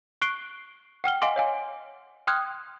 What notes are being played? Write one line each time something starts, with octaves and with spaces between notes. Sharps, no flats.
C#6 F#6 C7 D7 G7
F#5 G5 F6 G7
D#5 F5 F#5 G#5 C6 D6
C#5 F5 G#5
G5 C6 D#6 F6 F#6 G#6